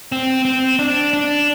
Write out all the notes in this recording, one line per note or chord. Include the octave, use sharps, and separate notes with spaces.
C4
C4
D4
D4